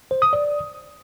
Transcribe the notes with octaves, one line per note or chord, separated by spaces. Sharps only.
C5
D#6
D5